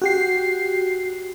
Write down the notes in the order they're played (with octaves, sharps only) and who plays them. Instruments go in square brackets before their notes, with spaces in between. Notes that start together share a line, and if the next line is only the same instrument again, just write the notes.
[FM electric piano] F#4 G4 C7